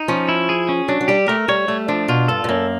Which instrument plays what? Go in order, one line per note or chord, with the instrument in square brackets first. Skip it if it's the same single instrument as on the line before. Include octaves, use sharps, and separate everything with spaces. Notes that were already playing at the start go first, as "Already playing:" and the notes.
Already playing: [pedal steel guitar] D#4
[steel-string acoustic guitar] F3 [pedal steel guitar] C#4
[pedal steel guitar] E4
G#4
C#4
[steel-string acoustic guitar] F#3 [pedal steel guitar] D4
[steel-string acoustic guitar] F#3
[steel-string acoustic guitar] G3 [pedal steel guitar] G4
[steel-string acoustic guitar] A3 [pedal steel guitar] A#4
[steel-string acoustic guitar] G3 [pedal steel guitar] C#5
[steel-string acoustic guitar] G3 [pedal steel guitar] A3
[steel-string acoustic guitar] F3 [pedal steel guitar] D4
[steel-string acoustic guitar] B2 [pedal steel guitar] F4
[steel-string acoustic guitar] G2 [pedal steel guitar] A4
[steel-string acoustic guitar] G2
[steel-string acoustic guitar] F#2 [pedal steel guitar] A#3